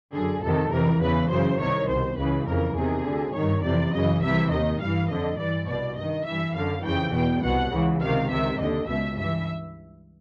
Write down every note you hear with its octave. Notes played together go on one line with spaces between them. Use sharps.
F#2 D3 G#4
F2 C3 D#3 A4
F2 C3 E3 A#4
E2 C#3 E3 B4
F#2 C#3 E3 C5
C2 C3 D#3 C#5
C2 B2 C5
C#2 C#3 E3 B4
F2 C#3 E3 A#4
E2 C3 D#3 G#4
D2 D3
G2 D#3 C#5
F2 C3 E3 D5
F#2 C#3 E3 D#5
C2 C3 E3 E5
D#2 D#3 D#5
G2 E3 F5
F2 D3 D#5
G2 E3 D5
C2 B2 D5
G2 D#3 D#5
G2 E3 E5
F#2 D3 F5
F2 C#3 E3 G5
E2 B2 G5
C2 B2 F#5
C#2 C#3 E3
C#2 C3 D#3 F5
C#2 C3 D#3 E5
D#2 D3 D#5
C#2 B2 E5
G2 E3 E5